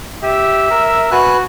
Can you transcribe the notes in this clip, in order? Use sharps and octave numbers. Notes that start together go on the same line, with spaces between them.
G4 E5
A#4
F#4 B4 G#5 F#6